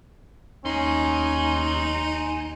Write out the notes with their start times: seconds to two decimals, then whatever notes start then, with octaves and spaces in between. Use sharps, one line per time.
0.65 D#2 C#4 D#4 G#5 C6